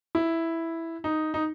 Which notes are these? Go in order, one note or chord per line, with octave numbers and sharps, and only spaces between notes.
E4
D#4
D#4